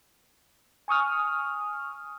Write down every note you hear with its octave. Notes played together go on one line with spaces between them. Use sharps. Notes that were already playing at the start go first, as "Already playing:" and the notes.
G#5 C#6 D#6 F6